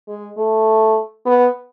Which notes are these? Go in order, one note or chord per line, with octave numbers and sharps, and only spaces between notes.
G#3
A3
B3